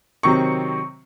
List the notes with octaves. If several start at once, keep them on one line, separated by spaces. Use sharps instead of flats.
C3 D#3 F#3 C4 C#6